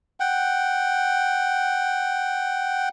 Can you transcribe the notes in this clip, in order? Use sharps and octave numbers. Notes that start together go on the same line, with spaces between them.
F#5 G5